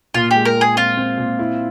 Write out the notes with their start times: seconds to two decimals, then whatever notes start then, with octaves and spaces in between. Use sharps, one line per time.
0.14 A#2 F4
0.31 G#3 G4
0.45 A#4
0.56 G#3
0.61 G#4
0.76 C4 F4
0.97 C4
1.18 A#2
1.39 E4